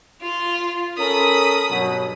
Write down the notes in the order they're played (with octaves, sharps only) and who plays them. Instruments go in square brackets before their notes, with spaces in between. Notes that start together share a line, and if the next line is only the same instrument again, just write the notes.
[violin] F4
[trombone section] C#4 A4 A#4 [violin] B5 D#6
[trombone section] G2 B2 F#3